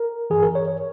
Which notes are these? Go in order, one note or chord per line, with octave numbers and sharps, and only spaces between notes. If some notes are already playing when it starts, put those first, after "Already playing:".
Already playing: A#4
G2 E3 G#4
A#4
C#5
C#5